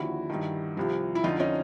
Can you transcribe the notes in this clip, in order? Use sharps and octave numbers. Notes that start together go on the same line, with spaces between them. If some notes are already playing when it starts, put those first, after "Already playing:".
Already playing: D#2 D3 F3 E4 F#4
G2 D#3
C2 C3 F3
E4
F2 D3 F3 D#4 F4
C#4 D#4